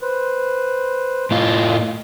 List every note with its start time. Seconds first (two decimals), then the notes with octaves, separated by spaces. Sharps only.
0.01 B4 C5
1.31 A2 F4 D#5